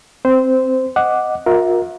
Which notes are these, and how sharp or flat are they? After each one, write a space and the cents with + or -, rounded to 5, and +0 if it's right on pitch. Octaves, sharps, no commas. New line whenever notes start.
C4 +0 C5 -15
D#5 +0 F#5 +0 D6 +0
F4 +45 A#4 +10 E5 -20